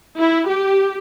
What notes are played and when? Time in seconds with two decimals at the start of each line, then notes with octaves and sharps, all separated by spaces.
0.19 E4
0.49 G4